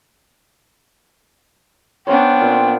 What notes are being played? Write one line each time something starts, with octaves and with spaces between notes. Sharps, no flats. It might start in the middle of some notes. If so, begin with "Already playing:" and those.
B3 C#4 D4 C5 C#5 G5
A#2 C4